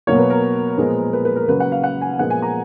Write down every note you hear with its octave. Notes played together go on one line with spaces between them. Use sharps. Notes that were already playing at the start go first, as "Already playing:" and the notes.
B2 F#3 A#3 C#5
B4
A#4
A#2 F3 G#3 B3
B4
B4
A#4
C#3 F#3 A#3 B4
F#5
F5
F#5
G#5
A#2 F3 G#3 B3 F#5
G#5
A#5